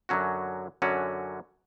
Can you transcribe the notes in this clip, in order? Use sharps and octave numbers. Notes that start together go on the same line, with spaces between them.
F#2 D3 F#3 C#4 F#4
F#2 D3 F#3 C#4 F#4